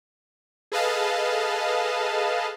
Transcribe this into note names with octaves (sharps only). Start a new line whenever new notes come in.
G#4 A4 B4 D#5 F5 A5